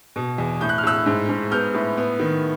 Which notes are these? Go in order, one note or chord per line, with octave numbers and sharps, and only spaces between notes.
B2
E2
A2 G6
F#6
F6
A2 E6 F#6
G#2
G#2
B3 F6 G6
A2
B3
D#3